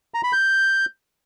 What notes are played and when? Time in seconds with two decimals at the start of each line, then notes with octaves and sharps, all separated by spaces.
0.14 A#5
0.24 B5
0.33 G6